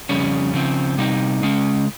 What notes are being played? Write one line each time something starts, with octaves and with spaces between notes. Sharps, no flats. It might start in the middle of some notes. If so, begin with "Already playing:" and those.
F2 C#3 G3 C#4
C#3 F3 C4
C3 G3 C4 D#4
C#3 G#3 C#4